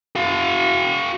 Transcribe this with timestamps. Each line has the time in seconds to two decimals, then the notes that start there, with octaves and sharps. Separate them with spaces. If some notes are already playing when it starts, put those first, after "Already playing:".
0.15 F#4 F5